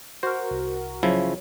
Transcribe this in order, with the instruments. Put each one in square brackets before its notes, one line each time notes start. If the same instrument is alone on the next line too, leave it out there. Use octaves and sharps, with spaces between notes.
[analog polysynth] F#4 A#4 [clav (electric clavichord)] C5
[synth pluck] C2
[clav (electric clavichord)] C#3 F3 E4 [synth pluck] F#3 C#5